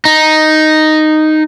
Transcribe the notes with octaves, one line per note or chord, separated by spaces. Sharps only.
D#4